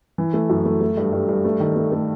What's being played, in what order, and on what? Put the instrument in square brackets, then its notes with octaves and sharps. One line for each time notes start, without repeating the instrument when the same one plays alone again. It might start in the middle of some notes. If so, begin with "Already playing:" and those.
[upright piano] E3
A3
F#2
A3
A3
G2
G2
G2
A3
D#3
A3
A3